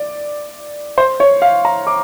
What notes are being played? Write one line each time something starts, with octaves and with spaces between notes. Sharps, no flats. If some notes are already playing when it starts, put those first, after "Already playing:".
Already playing: D5
C5
C#5
F5
A#5
D6